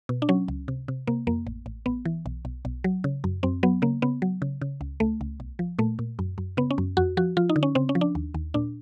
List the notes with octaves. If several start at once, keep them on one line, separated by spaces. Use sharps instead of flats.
B2
D4
F#3 C#4
C#2
C3
C3
C3 A#3
F2 A#3
A1
A1
A1 B3
E3
B1
B1
B1
F#3
C#3
F#2
F#2 C4
F#3 B3
C#3 A#3
C#3 B3
F#3
C#3
C#3
C#2
C#2 A3
C#2
B1
F3
A#2 A3
A#2
F#2
F#2
C#3 B3
C#4
F#2
F2 F#4
F3 F#4
F3 F4
D#4
D3
C#4
C#3 C4
C#4
F3
D4
D#2
D#2
A#2 D4